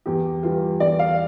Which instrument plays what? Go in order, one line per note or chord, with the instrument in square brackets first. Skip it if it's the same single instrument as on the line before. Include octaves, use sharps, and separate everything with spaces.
[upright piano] E2 G4
E3 G3 F4
E2 D5
F5